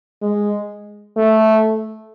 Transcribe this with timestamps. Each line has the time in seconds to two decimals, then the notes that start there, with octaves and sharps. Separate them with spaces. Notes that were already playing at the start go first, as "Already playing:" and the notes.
0.22 G#3
1.17 A3